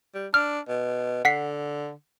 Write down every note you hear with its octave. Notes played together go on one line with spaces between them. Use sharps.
G3
D4 F6
B2
D3 F#5 B6 C7